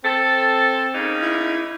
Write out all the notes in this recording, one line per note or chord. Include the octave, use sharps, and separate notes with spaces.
C4 A4
C#3 A#3 D#4
E4